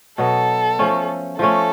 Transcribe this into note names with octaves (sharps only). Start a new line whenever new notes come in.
B2 F#3 B3 A4
F3 A3 C#4
F3 A3 C#4 A4